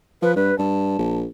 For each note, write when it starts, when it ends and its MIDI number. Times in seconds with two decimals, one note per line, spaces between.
0.22 0.32 53
0.22 0.34 71
0.36 0.52 43
0.36 0.57 71
0.59 0.95 43
0.59 1.17 81
0.99 1.26 34